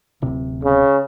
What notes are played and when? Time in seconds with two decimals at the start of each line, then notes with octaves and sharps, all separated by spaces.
0.22 D1 C3
0.64 C#3